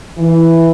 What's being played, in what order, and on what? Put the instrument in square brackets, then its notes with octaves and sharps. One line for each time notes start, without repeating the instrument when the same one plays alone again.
[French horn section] E3